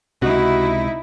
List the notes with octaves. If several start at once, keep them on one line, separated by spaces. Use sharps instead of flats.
C#2 C3 D#4 E4 F#4